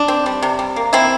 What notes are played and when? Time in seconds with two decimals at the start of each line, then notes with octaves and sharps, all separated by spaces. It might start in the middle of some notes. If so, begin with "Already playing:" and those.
Already playing: D4
0.08 C4
0.26 G3
0.43 C3
0.59 G3
0.76 A#3
0.93 E3 C4 E4